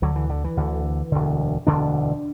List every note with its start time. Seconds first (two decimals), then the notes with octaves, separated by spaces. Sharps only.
0.02 D2 D3 F#3
0.16 E3
0.30 D3
0.44 E3
0.57 D2 D3
1.12 E1 D2 D3
1.67 E1 D2 D3 D4